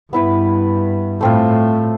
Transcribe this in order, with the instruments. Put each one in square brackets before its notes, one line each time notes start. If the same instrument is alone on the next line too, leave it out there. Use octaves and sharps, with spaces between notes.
[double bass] G2 [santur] B3 E4 B4
[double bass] A2 [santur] A3 C4 F4